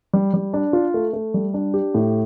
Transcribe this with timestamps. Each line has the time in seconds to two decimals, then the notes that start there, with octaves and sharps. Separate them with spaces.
0.13 G3
0.34 G3
0.54 D4
0.73 F4
0.94 A3
1.13 A3
1.34 G3
1.54 D4
1.74 G4
1.94 A2